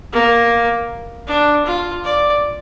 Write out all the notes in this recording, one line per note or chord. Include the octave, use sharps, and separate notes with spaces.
A#3
D4
F4
D5